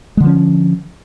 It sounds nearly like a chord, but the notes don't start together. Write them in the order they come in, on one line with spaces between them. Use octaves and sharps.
G#3 D3 F3 C#4